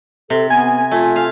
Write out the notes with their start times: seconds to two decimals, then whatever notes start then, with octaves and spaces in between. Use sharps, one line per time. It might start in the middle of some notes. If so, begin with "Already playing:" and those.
0.30 C3 A4
0.50 B3 G#5
0.91 A3 F4
1.16 F5